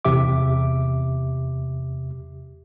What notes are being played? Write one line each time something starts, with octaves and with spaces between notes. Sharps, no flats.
E2 C3 G4 E5 D6